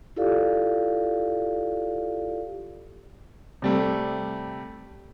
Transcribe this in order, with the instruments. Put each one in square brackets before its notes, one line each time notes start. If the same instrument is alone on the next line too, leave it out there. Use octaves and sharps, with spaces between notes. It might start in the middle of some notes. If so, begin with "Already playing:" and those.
[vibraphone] E4 F4 G4 A4 D5 F5
[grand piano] C3 G3 A3